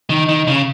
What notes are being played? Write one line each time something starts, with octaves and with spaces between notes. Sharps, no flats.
D#3
D#3
C#3